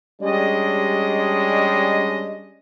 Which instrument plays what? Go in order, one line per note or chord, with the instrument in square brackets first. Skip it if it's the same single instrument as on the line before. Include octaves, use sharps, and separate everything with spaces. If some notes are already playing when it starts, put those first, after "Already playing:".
[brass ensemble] G3 G#3 C#4 D4 D5 D#5